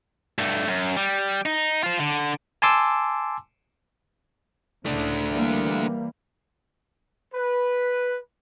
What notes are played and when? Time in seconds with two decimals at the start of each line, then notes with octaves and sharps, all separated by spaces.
0.38 G2 A3
0.68 F#2
0.97 G3
1.46 D#4
1.83 F4 C5
2.00 D3
2.62 G#5 A5 C6 D6 E6
4.86 C#2 A2 C#3 A3 D4
5.30 E3 G3 A#3
7.35 B4